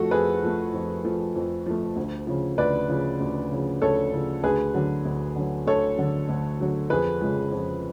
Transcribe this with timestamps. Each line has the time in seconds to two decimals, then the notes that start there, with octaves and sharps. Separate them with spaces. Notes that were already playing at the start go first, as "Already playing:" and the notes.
Already playing: F2 F3 A3 F#4 A4
0.11 F2 G#4 B4
0.43 F3 A3
0.74 F2
1.05 F3 A3
1.35 F2
1.66 F3 A3
1.96 D2
2.27 C#3 F3
2.58 D2 B4 D5
2.89 C#3 F3
3.20 D2
3.52 C#3 F3
3.82 D2 A4 C#5
4.13 C#3 F3
4.44 D2 G#4 B4
4.74 D3 F#3
5.05 D2
5.36 D3 F#3
5.66 D2 A4 C#5
5.98 D3 F#3
6.29 D2
6.60 D3 F#3
6.90 F2 G#4 B4
7.21 C#3 F3 G#3
7.52 F2